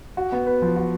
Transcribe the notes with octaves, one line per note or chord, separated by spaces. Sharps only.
F#4
B3
B4
F3
F#4